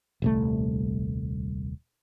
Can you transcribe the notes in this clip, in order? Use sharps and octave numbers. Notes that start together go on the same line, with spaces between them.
D#1 C2 A3